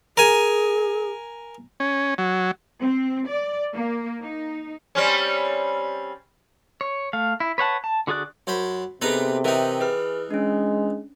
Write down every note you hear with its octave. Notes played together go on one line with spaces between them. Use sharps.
G#4 A#4 G#5
C#4
F#3
C4
D5
A#3
D#4
G3 C4 C#4
C#5
A3 F5
E4
B4 C#5 F#5 A5
A5
D3 F#4 G#4 D5 F#6
F#2 C5 B5
C3 B3 D#4 G#4 A4 B4 A#5
E3 D#4 A#4 E5 G5
G#4 B4 F6
G#3 C#4 D4